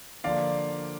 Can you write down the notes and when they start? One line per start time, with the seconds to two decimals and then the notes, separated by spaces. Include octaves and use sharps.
0.24 D3 F3 A#3 D5 F5